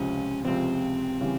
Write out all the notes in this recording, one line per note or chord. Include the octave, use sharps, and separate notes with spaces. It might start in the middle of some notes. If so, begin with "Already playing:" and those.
Already playing: C#2 C3 F3 C#4
C#2 C3 F3 C4
C#3 E3 G3